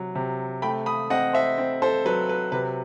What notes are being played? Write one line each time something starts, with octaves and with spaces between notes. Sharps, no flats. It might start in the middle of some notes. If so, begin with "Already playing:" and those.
Already playing: C3 F#3
C3
A3 G5 B5
B5 D#6
C4 D#5 F#5
C5 E5
C4
A4 C5
F#3 B4
B4
C3 B4